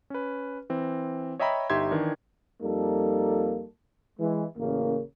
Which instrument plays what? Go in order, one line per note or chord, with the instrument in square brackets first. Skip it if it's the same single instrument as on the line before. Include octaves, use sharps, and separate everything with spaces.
[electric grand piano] C#4 B4
E3 C4
C#5 D#5 E5 G5 A#5 B5
G1 D#4 G4 E5 C6 G#6
D#3 E3 D4
[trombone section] F2 G3 A#3 D#4 A4
E3 G#3
A1 C#3 A#3